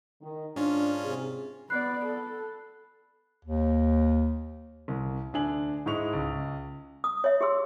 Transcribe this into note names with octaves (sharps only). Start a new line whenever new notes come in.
D#3
G#2 C#4 D4 F4
C3 G#4
B3 D5 B5 F#6 C7
A4
D#2
C2
D2 D4 G#5 F#7
G#2 G#3 E4 C#6 F7
C#2
D#6
C#5 E5
G4 G#4 C6 E6